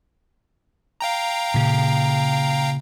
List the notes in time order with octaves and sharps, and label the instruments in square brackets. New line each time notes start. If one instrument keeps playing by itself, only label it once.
[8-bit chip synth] F5 G5 A#5
[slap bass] A#2 C#3